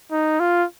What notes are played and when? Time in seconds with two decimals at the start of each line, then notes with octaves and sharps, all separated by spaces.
0.12 D#4
0.40 F4